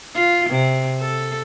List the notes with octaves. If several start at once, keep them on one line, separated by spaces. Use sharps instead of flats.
F4
C3
A4